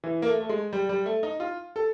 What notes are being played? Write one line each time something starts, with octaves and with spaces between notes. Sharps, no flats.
E3
A#3
A3
A3
G#3
G3
G3
A3
D#4
F4
A4